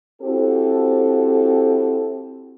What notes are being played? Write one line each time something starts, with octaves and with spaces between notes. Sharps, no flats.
C4 E4 F#4 G4 A4 C5